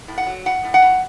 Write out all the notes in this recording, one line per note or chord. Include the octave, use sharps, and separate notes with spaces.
A2
F#5
F#3
A2 F#5
A2
F#5
A2